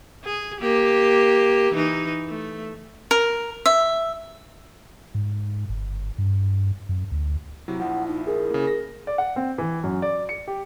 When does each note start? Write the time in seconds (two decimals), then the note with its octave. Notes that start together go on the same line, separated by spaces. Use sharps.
0.24 G#4
0.61 A#3 G4
1.74 E3 D#4
2.28 A3
3.11 A#4
3.66 E5
5.15 G#2
5.69 G1
6.18 G2
6.89 F#2
7.12 D2
7.68 C3 F#3 E4
7.80 A#1 F3 F#5
8.08 D#4
8.27 G#4 A#4
8.50 C#3 A#3
8.67 A#6
9.07 D5
9.18 F#5
9.36 C4
9.58 E3
9.84 F#2
10.02 D5
10.29 C#7
10.48 G4